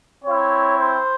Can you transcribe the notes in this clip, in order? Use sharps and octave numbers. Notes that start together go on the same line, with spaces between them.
C4 E4 C#5
C5